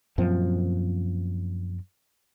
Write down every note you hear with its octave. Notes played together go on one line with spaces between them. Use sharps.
F#2 A#2 F3 C4